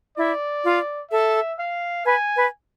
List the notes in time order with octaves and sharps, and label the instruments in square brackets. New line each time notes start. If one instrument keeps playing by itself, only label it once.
[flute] E4 [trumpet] D5
[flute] F4
[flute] A4 [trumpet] E5
[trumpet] F5
[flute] B4 [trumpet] G#5
[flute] B4